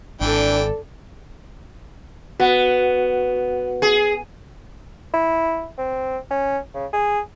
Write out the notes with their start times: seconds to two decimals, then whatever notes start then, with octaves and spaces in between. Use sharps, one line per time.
0.21 G#1 E3 D4 A4 D5 G5
2.40 B3 F#4 F#5
3.82 G#4
5.14 E4
5.78 C4
6.31 C#4
6.75 C#3
6.93 G#4